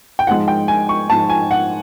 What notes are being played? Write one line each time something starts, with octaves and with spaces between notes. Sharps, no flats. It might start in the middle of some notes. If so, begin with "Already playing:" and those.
G5
G#2 F3 G#3 F#5
G5
G#5
C#6
G#2 F3 G#3 A5
G#5
F#5